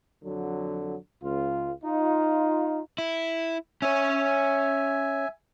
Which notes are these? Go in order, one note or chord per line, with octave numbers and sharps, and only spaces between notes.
F2 D3 F#3
C#2 F4
D#4 F4
E4
C#4 C#5 E5 G#5